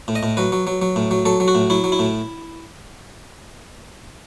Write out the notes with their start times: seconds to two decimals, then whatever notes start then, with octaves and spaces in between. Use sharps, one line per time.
0.08 A2
0.15 D#5
0.23 A2
0.37 F#3 B4
0.52 F#3
0.67 F#3
0.82 F#3
0.96 A2
1.11 F#3
1.25 F#3 A4
1.40 F#3
1.48 F#4
1.55 A2
1.70 F#3 E4
1.84 F#3
1.92 E4
1.99 A2